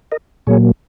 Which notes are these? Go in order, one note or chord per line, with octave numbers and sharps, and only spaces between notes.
A#4 D#5
A#2 F#3 A#3 G#4 C#5